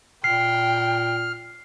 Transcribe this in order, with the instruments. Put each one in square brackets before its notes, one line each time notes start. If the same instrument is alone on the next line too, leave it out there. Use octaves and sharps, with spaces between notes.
[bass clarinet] A#2 [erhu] G5 [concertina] F6 [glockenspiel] C7